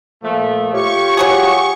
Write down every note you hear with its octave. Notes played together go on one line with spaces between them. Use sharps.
A#2 F3 A3
F4 G4 C#5 C#6
F#3 F#4 G#4